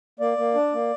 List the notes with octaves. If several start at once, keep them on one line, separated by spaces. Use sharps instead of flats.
A#3 D5
A#3
D4
A#3